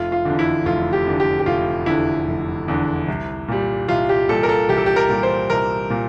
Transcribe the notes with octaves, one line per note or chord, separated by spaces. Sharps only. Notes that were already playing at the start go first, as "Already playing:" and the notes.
Already playing: F1 F4
F4
E2 D3
E4
F1 F4
G4
E2 D3
G4
G4
F1 F4
E2 D3 E4
F1
E2 D3
C2
A#2 G3
C2 F4
G4
A#2 G3 A4
A#4
A4
C2 G4
A4
G4
A#4
A#2 G3
C5
C2 A#4
A#2